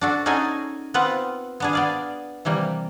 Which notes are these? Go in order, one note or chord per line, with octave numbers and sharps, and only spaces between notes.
D4 F#4 A4
C#4 D#4 F#4 G#4 A4 G#5
B3 C4 F4 B4 F#5
B3 D4 G#4
B3 D5 F5
C3 E3 G3 A#3